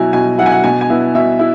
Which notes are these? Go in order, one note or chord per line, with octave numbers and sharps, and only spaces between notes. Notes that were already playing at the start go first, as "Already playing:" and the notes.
Already playing: B2 F#3 E4 G#5
B2 G#5
F#3 E4 F#5
G#5
F#5
B2 G#5
G#5
B3 E4
B2 E5
E4